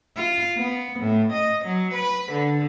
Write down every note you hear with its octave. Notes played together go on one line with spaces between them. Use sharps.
F4
B3
A2
D#5
F#3
B4
D3